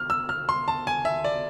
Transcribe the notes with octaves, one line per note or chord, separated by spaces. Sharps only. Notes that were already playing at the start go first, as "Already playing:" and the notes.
Already playing: F6
E6
F6
C6
A5
G#5
E5
D5